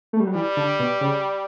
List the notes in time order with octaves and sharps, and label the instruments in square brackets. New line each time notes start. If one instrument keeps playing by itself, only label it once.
[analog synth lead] A3
G3
F#3
[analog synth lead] E3 [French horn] G3
[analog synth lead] D3
B2
C#3